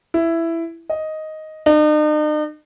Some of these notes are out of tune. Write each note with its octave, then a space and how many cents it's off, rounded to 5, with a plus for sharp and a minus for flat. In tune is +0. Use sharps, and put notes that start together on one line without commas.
E4 +10
D#5 +5
D#4 -45